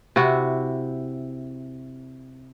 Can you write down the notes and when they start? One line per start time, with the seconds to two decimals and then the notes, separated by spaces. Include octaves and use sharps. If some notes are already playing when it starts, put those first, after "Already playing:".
0.16 C3 E4 F#4